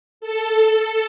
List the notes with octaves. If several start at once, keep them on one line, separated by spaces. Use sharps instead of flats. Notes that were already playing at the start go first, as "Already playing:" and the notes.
A4